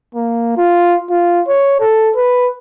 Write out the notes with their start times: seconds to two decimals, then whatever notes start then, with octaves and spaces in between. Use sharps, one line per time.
0.15 A#3
0.58 F4
1.10 F4
1.48 C#5
1.80 A4
2.16 B4